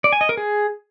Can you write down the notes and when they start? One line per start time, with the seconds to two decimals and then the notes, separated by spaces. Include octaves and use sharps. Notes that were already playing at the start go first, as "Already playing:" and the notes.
0.04 D5
0.13 G#5
0.21 D#5
0.29 A#4
0.37 G#4